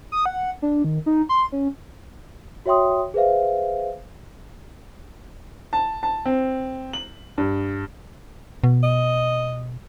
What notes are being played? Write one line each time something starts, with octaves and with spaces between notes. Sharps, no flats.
D#6
F#5
D4
D#3
D#4
C6
C#4
F#4 C#5 E5 G5 C6 D#6
G#4 B4 C5 E5 F5
A5
A5
C4
F#7
G2
B2
D#5